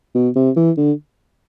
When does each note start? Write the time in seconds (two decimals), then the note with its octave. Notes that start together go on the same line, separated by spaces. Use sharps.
0.15 B2
0.36 C3
0.56 E3
0.78 D3